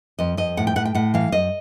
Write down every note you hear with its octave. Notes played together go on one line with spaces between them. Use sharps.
F2 D#5
F2 D#5
A2 F#5
G5
A2 F#5
G5
A2 F#5
E3 F5
F#2 D#5